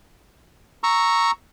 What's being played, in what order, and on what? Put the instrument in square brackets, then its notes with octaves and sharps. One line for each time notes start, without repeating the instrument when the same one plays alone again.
[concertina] A#5 C#6 E6